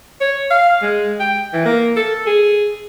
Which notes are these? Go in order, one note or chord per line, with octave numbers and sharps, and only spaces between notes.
C#5
F5
G#3
G5
E3
A#3
A4
G#4